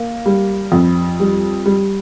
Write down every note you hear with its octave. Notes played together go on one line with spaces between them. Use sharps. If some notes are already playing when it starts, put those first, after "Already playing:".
Already playing: A#3
G3
F2
G3
G3